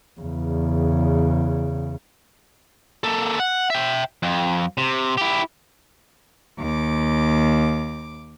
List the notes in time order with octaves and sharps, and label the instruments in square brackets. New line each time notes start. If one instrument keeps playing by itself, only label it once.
[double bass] E2 C#3
[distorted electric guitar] A#3 A4
F#5
E5 G5
F2
C3
E4 G4
[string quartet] D#2 D6